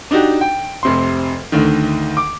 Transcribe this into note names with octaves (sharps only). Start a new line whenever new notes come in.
D4 D#4 F#4 G4
G5
F1 C3 C6
D2 D3 D#3
D6